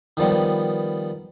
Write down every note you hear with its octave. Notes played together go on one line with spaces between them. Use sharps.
D#3 F3 G3 B3